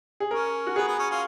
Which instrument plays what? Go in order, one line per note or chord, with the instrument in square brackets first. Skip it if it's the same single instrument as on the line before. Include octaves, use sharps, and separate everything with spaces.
[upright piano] G#4
[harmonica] C#4 [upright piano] A#4
[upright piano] F#4
[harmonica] B3 [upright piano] G#4
[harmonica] B3
C#4
C#4 F4